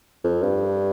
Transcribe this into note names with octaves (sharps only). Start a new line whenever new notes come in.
F2
G2